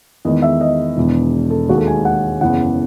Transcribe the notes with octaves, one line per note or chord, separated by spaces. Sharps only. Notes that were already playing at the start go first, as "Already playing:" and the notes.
E2 D#3 G#3 D#5
E5
D#5
E1 E2 D#3
A4
D#2 D#3 G#3 F#4
A4
G#5
F#5
F#1 E2 C#3 E3 F#5